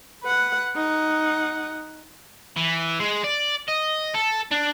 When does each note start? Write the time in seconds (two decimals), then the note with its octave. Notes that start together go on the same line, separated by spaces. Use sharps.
0.23 B4 F#5
0.75 D#4 F#5
2.57 E3
3.00 G#3
3.24 D5
3.69 D#5
4.15 A4
4.51 D4